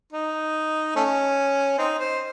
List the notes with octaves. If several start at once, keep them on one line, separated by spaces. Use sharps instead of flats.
D#4
A3 C#4
C4 D#4
C5